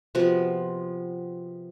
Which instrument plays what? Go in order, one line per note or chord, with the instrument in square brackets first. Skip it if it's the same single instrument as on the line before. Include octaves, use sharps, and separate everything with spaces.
[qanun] C3 F3 B3 F#4